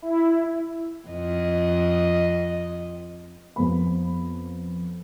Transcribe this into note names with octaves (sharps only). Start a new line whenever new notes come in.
E4
F2 D#5
F2 B3 B5